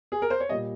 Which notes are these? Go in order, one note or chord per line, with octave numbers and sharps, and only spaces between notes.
G#4
A#4
C5
C#5
A#2 G3 D#5